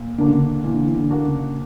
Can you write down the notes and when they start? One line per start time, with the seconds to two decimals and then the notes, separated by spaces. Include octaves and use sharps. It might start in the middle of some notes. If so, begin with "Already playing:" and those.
Already playing: A#2
0.18 D3 A#3 D4 F#4
0.28 C#3
0.37 D3
0.64 A#2 E3
0.74 D3
0.83 E3
0.94 D3
1.10 A#3 D4 F#4
1.25 C#3